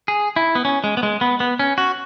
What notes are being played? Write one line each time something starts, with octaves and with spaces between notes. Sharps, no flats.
G#4
E4
B3
C#4
G#3
B3
G#3
B3
B3
C#4
F#4